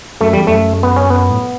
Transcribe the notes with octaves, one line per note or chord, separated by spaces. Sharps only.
F#2 A3
E2 G3
F#2 A3
B3
C#4
B3
A2